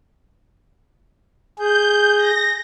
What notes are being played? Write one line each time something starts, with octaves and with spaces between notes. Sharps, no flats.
G#4 G6
A#6